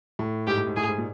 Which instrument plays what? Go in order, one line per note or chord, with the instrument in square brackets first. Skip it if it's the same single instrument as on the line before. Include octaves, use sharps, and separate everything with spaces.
[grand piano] A2
[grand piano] G#2 [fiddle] G4
[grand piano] A2
G#2
[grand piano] A2 [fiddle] G#4
[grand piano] G#2
A#2